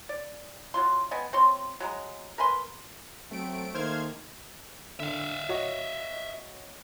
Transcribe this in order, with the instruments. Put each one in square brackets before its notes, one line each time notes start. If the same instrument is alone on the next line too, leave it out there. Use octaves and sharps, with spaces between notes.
[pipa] D5
F#3 F4 C6
B3 D#5 G5 G#5
C4 F4 C#5 C6
F#3 G#3 A#5
A#4 B4 G#5 C6
[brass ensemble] F#3 C4 [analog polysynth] A3 D7
[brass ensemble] D#3 A3 A#3 [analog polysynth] C5 F6 G#6
[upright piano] D3 [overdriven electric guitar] E5 F5
[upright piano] F#4 C#5 D#5